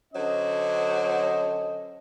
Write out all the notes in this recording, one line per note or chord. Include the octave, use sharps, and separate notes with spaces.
D3 F#3 C#4 A4 C5 D#5